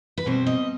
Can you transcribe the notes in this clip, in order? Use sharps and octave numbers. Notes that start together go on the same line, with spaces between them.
B4
B2 G3 C4 C5
D#5